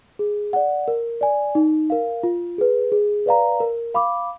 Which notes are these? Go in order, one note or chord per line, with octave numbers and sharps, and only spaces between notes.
G#4
D5 F#5
A#4
D5 G#5
D#4
A#4 F5
F4
G#4 B4
G#4
B4 D5 F5 A#5
A#4
F5 B5 D6